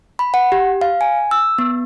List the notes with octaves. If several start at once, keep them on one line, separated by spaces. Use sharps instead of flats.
B5
F#5
G4
F5
G#5
E6
B3